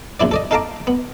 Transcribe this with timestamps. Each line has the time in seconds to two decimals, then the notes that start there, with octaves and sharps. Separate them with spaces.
0.20 A#1 F#2 E4 D5
0.31 A4 D5 D#5
0.51 D#4 A4 F5 A5 A#5 D6
0.87 B3